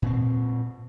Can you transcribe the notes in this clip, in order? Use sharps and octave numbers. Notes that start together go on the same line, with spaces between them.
A#2 C4